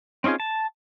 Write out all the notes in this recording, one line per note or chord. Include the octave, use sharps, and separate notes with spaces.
C4 C#4 D#4 F4 G#4
A5